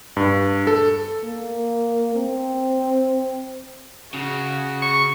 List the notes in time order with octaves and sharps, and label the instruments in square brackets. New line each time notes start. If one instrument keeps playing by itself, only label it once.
[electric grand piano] G2
A4
[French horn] A#3
C4
[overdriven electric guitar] C#3 [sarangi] F#4
[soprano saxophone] C#6